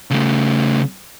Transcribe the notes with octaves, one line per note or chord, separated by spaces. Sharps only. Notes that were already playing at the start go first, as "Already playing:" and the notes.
C#3 A3